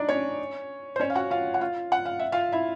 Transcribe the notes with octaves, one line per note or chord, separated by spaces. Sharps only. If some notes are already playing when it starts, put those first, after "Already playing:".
Already playing: D4 D#4 D5
C#4 C#5
C5
C#4 C#5
F5
F#4 F#5
F4 F5
F#5
F4 F5
F#5
F5
E5
F4 F5
E4 E5